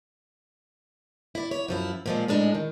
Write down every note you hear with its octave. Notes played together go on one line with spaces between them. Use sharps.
E4 D5
C#5
F#2 F3 E4
A#2 F3 G#3
A2 G#3 D4 D#4
D#3